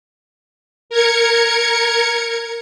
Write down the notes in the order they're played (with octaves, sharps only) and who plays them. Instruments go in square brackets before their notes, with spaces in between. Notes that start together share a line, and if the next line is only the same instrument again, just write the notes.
[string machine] A#4 G#6 C#7